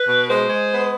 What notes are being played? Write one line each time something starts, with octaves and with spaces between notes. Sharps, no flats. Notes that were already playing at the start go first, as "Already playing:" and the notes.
Already playing: B4
B2
G#3 C5
G#3
B3